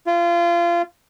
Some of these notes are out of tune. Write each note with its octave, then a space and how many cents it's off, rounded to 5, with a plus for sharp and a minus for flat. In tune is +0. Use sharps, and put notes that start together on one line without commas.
F4 -25